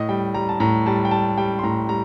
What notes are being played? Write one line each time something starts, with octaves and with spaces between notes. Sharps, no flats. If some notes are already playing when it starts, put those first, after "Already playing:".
Already playing: A2 D#5
G3 G5
G3 A#5
A5
A2 A#5
G3 A5
G5
G3 A5
G3 G5
C6
A2 A#5
G3 A#5